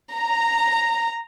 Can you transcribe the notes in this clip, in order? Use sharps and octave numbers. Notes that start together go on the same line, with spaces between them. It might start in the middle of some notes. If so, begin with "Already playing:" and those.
A#5